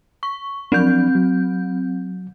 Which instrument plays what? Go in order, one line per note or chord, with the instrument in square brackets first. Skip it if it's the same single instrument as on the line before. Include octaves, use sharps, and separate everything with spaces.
[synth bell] C#6
[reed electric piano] F3 F#3 D4 [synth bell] C4 G6
[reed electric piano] F#3